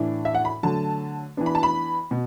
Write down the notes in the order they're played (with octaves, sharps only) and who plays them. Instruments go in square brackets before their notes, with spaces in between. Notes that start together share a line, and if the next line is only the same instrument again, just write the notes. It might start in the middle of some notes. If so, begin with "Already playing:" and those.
Already playing: [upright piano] A2 E3 D4
E5
F#5
B5
D3 F#3 A3 A5
E3 B3 D4
B5
A5
B5
B2